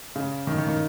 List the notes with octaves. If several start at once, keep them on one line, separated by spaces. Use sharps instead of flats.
C#3
D#3
D#3
D#3